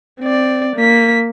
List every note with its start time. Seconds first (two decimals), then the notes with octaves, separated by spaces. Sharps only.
0.20 C4 D5
0.76 A#3 B6